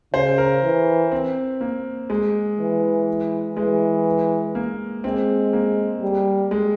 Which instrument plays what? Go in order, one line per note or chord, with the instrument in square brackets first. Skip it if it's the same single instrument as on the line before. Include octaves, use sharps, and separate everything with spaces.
[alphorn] C#3 [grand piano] C5
[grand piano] A#4
[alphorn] E3
[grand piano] C4
A#3
G#3
[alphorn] E3
[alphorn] E3 [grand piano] G#3
[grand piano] A#3
[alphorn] G#3 [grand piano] C4
[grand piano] A#3
[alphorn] G3
[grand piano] G#3